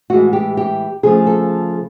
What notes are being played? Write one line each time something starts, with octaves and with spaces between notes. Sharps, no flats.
A2 E3 G#3 F#4
G4
G4
C#3 F3 A3 G#4
A4